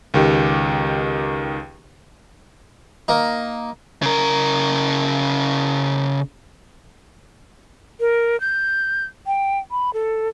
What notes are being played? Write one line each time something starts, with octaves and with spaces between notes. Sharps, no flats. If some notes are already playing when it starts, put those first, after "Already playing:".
C#2 D#3 G4
A#3 D#4
C#3 A#4
A#4
G6
G5
B5
A4